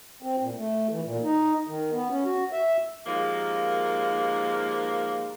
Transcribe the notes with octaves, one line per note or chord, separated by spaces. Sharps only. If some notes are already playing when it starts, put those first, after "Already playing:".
C4
A#2
A3
E3
A#2
D#4
D#3
B3
C#4
F#4
E5
D#2 F3 G#3 A#3